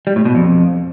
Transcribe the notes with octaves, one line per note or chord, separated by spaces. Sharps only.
G3
A2
B2
F2